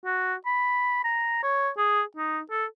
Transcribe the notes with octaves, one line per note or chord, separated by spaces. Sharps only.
F#4
B5
A#5
C#5
G#4
D#4
A4